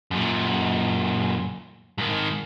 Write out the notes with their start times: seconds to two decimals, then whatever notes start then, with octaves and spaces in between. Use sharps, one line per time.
0.11 F#2 A#2
1.98 G#2 D#3